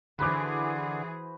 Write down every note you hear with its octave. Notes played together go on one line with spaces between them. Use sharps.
D3 E3 F#4 G#4 B4 C5 B5 D6